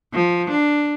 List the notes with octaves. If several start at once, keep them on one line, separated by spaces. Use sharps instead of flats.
F3
D4